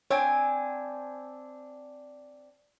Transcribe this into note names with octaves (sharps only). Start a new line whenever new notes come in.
C4 D4 C#5 G#5